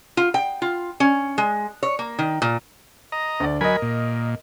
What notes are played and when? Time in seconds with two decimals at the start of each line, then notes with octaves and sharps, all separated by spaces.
0.17 F4
0.34 G5
0.62 F4
1.00 C#4
1.38 G#3
1.83 C#5
1.99 A#3
2.19 D#3
2.42 A#2
3.12 D#5 A#5
3.40 D2 D5
3.61 F#3 A#4 D#5 G#5 B5
3.82 A#2